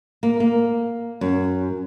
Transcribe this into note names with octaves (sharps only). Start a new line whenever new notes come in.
A#3
A#3
F#2